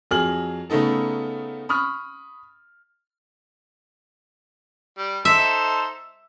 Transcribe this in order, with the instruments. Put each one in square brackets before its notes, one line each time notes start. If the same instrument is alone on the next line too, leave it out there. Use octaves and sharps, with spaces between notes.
[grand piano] F2 F#3 G#4 F6 F#7
C#3 A3 B3 D#4 A4
B5 C#6 D#6 F6
[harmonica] G3
[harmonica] D#4 A4 C5 [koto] E5